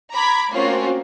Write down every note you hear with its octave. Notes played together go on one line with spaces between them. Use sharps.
A#5 B5 D6 G#6 B6
A3 A#3 C4 C#4 F4 F#4